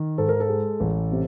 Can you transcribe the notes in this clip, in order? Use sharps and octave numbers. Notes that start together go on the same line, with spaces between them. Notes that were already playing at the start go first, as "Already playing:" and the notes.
Already playing: D#3
G#2 A4
A#4
A4
G#3
A1
C3